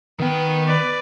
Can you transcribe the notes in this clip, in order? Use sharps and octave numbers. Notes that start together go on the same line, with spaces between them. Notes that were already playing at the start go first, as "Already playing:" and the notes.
D#3 B3 G5
B4 D5